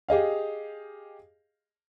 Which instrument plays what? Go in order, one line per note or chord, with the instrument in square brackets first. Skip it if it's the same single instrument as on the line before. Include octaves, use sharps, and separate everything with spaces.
[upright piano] G4 G#4 D#5 F5